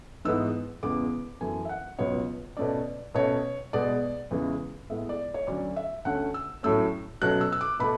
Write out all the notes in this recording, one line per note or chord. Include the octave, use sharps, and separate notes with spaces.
G#2 E3 G#3 B3 E6
E2 C#3 G#3 B3 D6
F#2 E3 A3 G#5
E5
F#5
C#2 B2 F#3 B3 C#5
B2 A3 C#4 D5
B2 A3 C#4 C#5
B2 G#3 B3 D5
E2 C#3 E3 G#3
A2 G#3 B3 E5
D5
C#5
D2 D3 F#3 C#4 D5
E5
D2 D3 A3 C#4 F#5
E6
A2 F#3 A3 C#4 E6
B2 F#3 A3 C#4 F#6
E6
E6
D6
B2 A3 B5